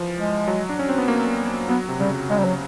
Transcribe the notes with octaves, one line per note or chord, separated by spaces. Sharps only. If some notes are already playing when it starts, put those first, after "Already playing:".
Already playing: E3 F3
G#3
F#3
D4
C#4
C4
B3
A#3
F#3 B3
C3
C#3 G3
C#3 G#3
G3
F#3